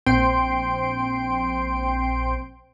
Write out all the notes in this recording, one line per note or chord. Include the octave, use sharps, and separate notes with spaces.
A#1 C4 G5 C6 D7